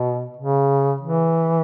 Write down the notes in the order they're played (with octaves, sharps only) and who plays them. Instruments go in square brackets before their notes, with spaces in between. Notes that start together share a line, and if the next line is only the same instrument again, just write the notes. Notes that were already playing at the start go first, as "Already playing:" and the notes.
Already playing: [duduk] B2
C#3
E3